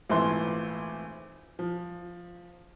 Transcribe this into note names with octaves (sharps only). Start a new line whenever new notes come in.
G#1 A#2 E3 A3 C6
F3